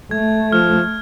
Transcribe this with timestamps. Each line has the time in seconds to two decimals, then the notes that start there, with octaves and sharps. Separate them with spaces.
0.11 A3 G#6
0.52 F3 F6